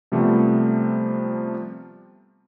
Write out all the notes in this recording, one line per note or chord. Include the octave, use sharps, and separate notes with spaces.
C3 F3 G3 A3 B3